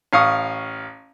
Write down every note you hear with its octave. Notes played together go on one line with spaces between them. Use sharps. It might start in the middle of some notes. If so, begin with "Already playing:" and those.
A1 F5 C#6 D#6